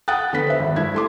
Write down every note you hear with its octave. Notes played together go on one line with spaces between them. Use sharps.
F#5 G5 D#6 F#6 A6
D3 B3 B6
C5 E5
G#1
G2 E4 G#6
A3 C6 D6